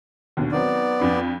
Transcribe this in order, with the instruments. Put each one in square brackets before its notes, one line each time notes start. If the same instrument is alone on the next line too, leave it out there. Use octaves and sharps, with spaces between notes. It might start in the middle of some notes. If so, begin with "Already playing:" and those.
[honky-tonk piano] D#2 B2 D3
[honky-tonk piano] D#3 F#3 C4 [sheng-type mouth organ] B3 D5
[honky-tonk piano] F2 D4 B5